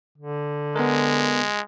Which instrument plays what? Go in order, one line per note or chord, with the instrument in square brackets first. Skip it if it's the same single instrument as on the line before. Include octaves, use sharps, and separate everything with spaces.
[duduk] D3
[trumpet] G#3 [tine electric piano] B3 A#4